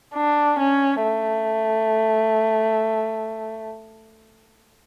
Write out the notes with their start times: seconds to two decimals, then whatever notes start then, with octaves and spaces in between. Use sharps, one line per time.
0.15 D4
0.59 C#4
1.03 A3